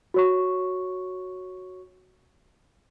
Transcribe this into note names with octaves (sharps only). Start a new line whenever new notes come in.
F#4 C#5 C#6